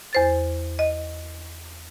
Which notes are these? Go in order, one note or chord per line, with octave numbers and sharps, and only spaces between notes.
E2 C5 A6
D#5